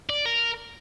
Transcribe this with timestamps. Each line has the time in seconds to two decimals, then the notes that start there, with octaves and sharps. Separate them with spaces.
0.09 D5
0.25 A#4